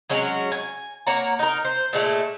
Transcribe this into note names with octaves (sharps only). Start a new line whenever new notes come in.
F#3 G#3 C#4 F#4
G#5
A#3 C#5 F#5 A#5
D#4 A#4
C5
A#2 G#3 A3